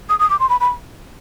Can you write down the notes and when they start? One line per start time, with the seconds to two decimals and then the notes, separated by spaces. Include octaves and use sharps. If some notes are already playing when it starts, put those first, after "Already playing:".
0.09 D#6
0.19 D#6
0.30 D6
0.39 C6
0.49 B5
0.60 B5